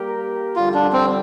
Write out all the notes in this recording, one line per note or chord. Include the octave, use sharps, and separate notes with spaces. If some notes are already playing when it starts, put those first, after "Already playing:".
Already playing: G3 A#3 G4 A#4
F2 D3 G3 F4
D4
C4